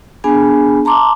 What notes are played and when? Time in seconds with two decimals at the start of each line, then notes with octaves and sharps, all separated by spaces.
0.24 B3 D4 G#4 G#5 B5
0.85 A5 A#5 C6 D6